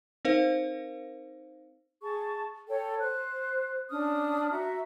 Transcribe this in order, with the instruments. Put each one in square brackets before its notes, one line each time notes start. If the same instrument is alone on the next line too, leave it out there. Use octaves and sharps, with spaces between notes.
[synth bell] C4 D#4 A#4 C5 F5
[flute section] G#4 A5 C#6
A4 C#5 G5
C5 F#6
C#4 D4 D#6 F6
F#4 E5 A#5